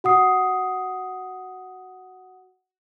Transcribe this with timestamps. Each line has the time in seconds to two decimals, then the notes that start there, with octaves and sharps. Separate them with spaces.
0.04 F#4 F#5 D#6 C7